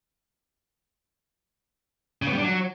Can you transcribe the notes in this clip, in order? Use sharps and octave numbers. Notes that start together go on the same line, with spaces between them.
C#3
B3
G3
D4
F#3